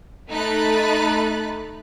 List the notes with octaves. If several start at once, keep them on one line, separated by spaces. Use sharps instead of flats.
A3 D#4 B5 F#6 A6